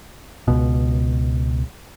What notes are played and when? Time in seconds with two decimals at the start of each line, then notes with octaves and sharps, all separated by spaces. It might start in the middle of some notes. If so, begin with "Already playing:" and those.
0.48 C#2 B2